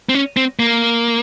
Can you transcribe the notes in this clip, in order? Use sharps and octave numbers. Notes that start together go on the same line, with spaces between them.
C4
C#4
C4
A#3